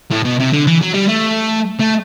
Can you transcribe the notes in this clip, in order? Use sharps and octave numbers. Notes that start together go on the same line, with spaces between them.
A2
B2
C3
D3
E3
F#3
G3
A3
A3